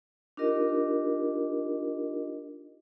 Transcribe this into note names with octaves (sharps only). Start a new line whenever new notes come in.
D4 D#4 F4 G4 A#4 D#5